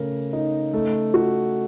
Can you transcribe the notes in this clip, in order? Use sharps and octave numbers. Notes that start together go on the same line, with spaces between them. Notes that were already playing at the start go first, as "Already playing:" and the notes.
Already playing: C#3 A3 A#4
D#4
A3
F#4